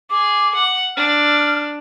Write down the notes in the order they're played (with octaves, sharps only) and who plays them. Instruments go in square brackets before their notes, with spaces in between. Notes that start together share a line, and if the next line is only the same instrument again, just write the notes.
[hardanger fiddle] G#4 [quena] D6
[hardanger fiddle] F#5
[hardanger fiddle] D4 [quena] F6